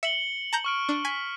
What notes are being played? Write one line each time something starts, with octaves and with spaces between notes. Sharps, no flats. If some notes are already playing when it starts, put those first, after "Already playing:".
E5 C#7 F#7 G7
A5 A#5 G6
C#6 F6 D7
D4
G#5 B6